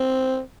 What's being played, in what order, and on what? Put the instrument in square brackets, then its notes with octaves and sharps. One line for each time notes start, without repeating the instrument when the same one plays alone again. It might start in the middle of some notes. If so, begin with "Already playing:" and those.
Already playing: [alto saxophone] C4